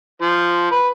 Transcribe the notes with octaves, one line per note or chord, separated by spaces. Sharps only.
F3
B4